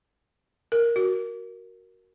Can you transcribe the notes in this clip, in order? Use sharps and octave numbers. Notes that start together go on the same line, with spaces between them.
A#4
F#4